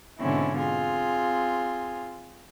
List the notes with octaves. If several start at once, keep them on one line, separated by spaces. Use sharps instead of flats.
G#2 B2 D3 C4 C#4 E4
C4 F4 G#4